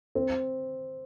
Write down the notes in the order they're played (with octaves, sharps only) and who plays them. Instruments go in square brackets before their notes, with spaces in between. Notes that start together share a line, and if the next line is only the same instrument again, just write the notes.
[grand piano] C4